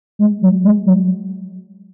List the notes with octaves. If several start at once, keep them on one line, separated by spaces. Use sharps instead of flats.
G#3
F#3
G#3
F#3